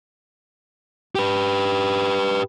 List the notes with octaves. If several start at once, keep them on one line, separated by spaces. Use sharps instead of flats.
G4 B4